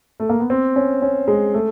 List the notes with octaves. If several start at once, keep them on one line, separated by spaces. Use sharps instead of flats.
A3
A#3
B3
C4
C#4
C#4
G#3
A3